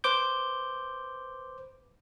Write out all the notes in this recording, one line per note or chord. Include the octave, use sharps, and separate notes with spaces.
B4 C5 D6 G6